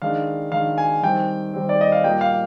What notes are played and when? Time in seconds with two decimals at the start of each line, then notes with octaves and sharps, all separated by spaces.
0.02 D#3 G#3 D4 F5
0.52 D#3 G#3 D4 F5
0.78 G#5
1.03 D#3 G3 C4 G5
1.54 D#3 G3 C4
1.69 D5
1.81 D#5
1.92 F5
2.04 A#2 G3 A#3 G5
2.21 F5